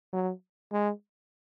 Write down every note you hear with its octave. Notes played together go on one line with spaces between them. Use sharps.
F#3
G#3